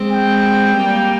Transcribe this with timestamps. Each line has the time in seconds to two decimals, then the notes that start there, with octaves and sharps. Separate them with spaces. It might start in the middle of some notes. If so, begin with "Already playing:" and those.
Already playing: G#3 C4
0.10 G5
0.76 G3 A#3